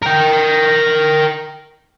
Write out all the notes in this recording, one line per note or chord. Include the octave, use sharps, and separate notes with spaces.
A#4 G5